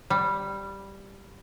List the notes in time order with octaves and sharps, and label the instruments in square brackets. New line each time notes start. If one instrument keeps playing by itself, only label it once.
[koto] G3